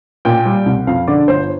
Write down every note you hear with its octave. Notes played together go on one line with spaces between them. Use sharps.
A#2 G5
G3
C2
F2 F5
D3 D5
G1 C5